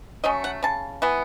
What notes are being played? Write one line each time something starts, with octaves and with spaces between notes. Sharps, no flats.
F#3 A3 C#4 D#5
F#5
C#3 A5
E3 B3